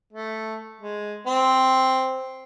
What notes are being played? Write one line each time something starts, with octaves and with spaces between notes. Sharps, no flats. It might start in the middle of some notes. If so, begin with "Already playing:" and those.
A3
G#3
C4